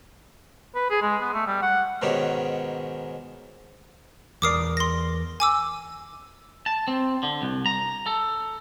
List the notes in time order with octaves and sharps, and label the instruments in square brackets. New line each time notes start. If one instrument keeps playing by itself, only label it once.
[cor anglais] B4
G#4
G#3
B3
A3
G3
F#5
[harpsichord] G#2 B2 D#3 C#4 G4
[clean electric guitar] E2 A#4 D5 [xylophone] D6 D#6 C7
[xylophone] C6 A#6
G#5 D6 E6
[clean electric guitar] A5
C4
D3
C2
A#5
A4